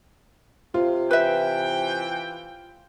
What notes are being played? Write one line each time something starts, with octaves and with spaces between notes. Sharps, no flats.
C3 F4
E3 B4 E5 G5